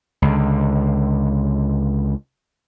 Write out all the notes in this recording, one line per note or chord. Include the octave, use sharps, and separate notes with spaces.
C#2 D3